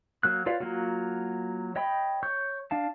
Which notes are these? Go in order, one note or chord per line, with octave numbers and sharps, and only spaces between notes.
F#3 A#3 F#6
F4 B4 C#5 D5 F5
F#3 A#3 F4 F#4
C#5 D#5 G5 B5
C#5 C#6 G6
D4 F5 A5